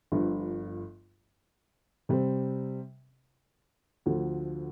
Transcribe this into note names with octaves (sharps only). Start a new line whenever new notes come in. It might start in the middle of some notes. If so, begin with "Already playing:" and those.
G1 G2 F3
C3 G3 C4
D2 D3 F3